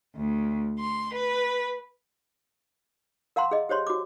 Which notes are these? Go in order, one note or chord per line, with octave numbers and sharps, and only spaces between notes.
D2
C6
B4
A#4 F5 F#5 A#5 C6
G#4 D#5
G4 C5 C#5 C6
F#4 D6